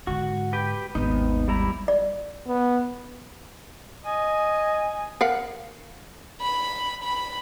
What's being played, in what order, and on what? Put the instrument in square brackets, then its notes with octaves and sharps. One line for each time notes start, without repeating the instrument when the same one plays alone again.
[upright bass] G#2 D3 [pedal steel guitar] F#4
[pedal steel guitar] G4 B4 G5
[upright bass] G#1 D#2 [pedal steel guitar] B3 D#4
[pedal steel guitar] G3 E4 A#5
[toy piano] D5
[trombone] B3
[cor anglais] D#5 [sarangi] G#5
[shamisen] A#4 F5 F#5
[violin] B5
B5